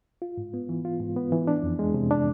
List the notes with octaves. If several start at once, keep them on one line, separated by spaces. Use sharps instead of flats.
F4
G#2
B3
E3
F4
G#2
B3
E3
D4
F2
G#3
C3
D4